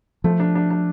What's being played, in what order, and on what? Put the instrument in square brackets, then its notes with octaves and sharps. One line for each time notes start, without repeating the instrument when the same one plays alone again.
[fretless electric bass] F3 [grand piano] A3
[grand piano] D4
D4
D4